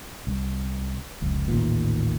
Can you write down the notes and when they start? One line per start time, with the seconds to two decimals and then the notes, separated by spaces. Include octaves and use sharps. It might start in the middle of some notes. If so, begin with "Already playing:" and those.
0.27 C2
1.22 F1 C#2
1.48 A1 D#2 A#2